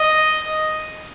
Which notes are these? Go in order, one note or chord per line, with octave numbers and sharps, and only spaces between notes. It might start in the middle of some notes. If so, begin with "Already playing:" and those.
Already playing: D#5